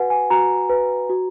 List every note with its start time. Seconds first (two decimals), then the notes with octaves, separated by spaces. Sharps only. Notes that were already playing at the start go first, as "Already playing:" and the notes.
Already playing: F#4 B4 F#5 G#5
0.10 G#5
0.30 F#4 A#5
0.69 B4
1.10 F#4